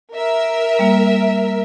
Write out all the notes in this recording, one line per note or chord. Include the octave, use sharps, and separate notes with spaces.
A#4 E5
G3 A#3